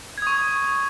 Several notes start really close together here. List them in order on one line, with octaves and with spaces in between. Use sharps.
G#6 D#6 C#6